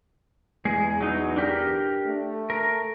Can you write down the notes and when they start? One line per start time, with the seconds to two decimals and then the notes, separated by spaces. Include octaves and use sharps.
0.65 E2 G#3 G#4
1.01 F#3 D#4
1.36 D4 G4 A#4
2.06 A3
2.50 A#4